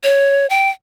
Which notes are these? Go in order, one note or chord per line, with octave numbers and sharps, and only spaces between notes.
C#5
G5